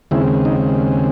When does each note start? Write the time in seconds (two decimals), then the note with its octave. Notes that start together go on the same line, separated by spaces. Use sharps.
0.11 D#2 C#3 G#3 C4 E4
0.45 D#4